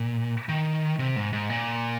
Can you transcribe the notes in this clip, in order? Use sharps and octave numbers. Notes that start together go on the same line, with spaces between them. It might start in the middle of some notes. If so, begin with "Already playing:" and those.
Already playing: A#2
D#3
C3
G#2
G#2
A#2